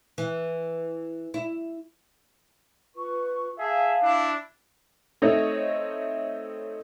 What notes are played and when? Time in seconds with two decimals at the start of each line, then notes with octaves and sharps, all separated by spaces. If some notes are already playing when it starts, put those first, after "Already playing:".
0.18 E3
1.34 E4
2.95 F4 B4 C#6
3.59 G#4 E5 F5 A5
4.02 D4 E4
5.22 A3 C4 D#4 C#5 D#5